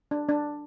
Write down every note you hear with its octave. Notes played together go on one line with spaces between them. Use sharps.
D4
D4